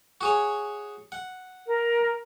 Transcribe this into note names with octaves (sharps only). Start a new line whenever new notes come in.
F#4 G#4 C#5
F#5
A#4